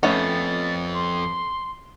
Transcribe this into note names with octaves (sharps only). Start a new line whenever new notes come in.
F2 A3 B3 C#4 A6
C6